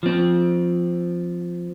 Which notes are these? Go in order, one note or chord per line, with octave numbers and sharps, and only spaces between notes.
F3 C4